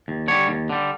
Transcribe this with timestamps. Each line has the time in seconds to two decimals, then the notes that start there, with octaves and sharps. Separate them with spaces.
0.08 D#2
0.28 D3 G3 C#5
0.48 D#2
0.70 D3 G3